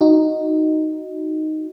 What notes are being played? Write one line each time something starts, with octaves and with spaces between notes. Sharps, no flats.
D#4 F#4